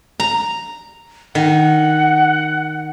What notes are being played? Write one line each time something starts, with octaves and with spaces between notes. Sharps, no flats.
A#5
D#3 F#5